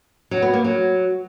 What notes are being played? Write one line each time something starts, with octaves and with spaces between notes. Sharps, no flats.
F#3
B3
A#3
F#3